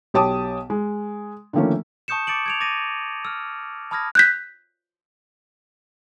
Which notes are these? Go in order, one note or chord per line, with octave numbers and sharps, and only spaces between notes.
B1 G4 C#5 A5 D6 D#6
G#3
D3 D#3 F3 A3 A#3 C#4
A5 C#6 D#6 G6 C#7 E7
D6 A6 C#7 D7 F#7
G#6 D7 F7
D6 A6 A#6 D#7
E6 F6
A5 B5 D#6 F6 G#6 A#6
F#6 G6 B6